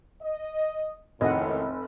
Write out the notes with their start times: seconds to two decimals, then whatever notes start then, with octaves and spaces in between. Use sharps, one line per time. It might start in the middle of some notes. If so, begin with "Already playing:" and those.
0.23 D#5
1.21 F1 C#2 A2 D#3 D#5 F#5